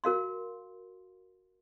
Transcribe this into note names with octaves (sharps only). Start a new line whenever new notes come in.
F#4 A#4 F5 C6